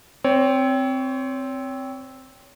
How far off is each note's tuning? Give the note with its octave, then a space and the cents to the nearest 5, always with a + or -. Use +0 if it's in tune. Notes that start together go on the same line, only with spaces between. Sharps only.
C4 +0 C#5 +25